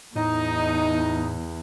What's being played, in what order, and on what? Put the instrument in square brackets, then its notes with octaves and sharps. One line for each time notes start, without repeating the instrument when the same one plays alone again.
[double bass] E2 [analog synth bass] A2 [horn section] D#4